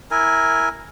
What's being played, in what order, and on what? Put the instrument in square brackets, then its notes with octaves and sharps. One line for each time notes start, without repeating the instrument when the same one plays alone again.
[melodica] E4 A#4 G#5